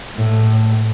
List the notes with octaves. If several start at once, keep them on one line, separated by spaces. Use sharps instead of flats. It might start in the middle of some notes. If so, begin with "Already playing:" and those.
A2